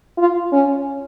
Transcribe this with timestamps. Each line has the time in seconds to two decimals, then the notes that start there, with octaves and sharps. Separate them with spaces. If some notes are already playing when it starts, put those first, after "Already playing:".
0.18 F4
0.53 C#4